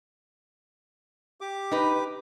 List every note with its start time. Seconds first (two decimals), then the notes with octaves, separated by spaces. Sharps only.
1.41 G4 D6
1.71 D#4 B4